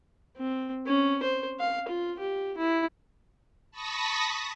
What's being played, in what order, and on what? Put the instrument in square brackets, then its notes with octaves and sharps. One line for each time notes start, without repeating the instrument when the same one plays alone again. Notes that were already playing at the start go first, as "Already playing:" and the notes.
[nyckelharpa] C4
C#4
C5
F5
F4
G4
E4
[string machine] A5 B5 C#6 D#6 A#6 B6